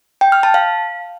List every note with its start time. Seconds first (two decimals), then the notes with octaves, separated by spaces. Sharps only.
0.21 G5
0.32 F6
0.43 A5
0.54 F5